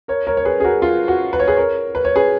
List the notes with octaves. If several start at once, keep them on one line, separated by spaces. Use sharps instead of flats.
A#4 C#5
A#4 C#5
C#5
G#4 B4
G#4
F#4 A#4
F4
F#4
B4
C#5
G#4 B4
A#4 C#5
B4
C#5
G#4 B4